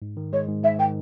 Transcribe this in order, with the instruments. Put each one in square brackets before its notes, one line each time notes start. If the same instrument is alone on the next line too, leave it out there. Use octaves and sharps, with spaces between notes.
[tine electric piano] G#2
D#3
[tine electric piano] G#3 [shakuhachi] C#5
[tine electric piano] G#2
[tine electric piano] G#2 [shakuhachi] E5
[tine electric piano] D#3 [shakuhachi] G5